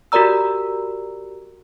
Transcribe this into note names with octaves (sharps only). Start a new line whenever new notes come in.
F#4 G4 A#4 D5 A#5 E6